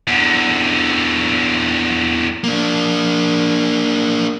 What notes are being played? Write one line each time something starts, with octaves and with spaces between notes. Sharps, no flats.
E2 D3
A#3 D4